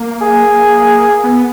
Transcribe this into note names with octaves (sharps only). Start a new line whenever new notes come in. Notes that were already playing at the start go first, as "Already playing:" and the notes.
Already playing: A#3
G#4
B3